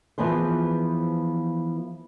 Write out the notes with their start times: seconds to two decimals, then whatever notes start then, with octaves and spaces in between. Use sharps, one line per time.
0.18 E3 F3 B3 G#4 C5